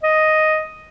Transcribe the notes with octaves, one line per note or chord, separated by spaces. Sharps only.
D#5